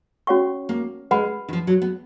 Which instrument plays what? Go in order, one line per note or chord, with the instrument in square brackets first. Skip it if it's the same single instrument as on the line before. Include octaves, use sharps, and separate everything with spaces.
[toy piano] C#4 F#4 C#5 F#5 C#6
[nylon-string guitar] A#3
[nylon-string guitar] G#3 [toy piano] B4 F#5 B5
[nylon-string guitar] D#3
F3
F#3
B3